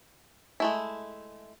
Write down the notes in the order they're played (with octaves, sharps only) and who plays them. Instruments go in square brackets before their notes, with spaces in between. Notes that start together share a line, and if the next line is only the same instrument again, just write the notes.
[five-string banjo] G#3 A3 E4